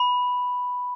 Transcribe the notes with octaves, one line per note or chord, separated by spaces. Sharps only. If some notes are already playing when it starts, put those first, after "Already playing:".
Already playing: B5